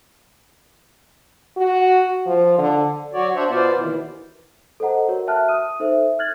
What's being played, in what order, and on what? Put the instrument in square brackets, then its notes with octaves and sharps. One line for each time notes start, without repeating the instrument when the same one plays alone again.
[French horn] F#4
F3
D3
[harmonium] F#3 F#4 C#5 D5
D4 C5 C#5 E5 F#5
B2 B3 F4 C5 D5
D#2 E3
[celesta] A4 C5 D#5 F#5 A#5
F#4 A#4 C#5
E5 G5 A5 F6 F#6
D#6 D#7
D#4 A4 C5 E5
F6 F#6 G#6 A6 F#7